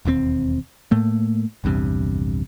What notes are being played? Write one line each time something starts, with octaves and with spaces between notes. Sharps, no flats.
E1 D#2 C#3 C4
A2 A3 A#3
A#1 E2 G2 C3